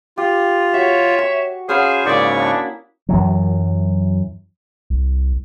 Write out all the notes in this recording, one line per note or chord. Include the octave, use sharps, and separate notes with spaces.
F4 G4
F#4 C#5 E5
C#6
C#4 G#4 B4 C5 F5 F#5
G#2 C#3 A#3 E4 C#5 D5 C#6 D#6
D4
F#2 E3 F#3
C2